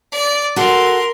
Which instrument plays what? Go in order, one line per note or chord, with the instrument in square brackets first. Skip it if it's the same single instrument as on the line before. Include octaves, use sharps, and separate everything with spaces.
[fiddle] D5
[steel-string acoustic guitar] F#4 A4 [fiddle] A#4 C6